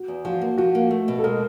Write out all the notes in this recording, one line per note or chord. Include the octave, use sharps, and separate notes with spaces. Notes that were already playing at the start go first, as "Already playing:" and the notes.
Already playing: F#4
E2
F3 F#4
A#3
F3 F#4
A#3
A3
B2
A4
G#3 A#4